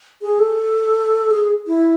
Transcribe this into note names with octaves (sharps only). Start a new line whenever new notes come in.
G#4
A4
G#4
E4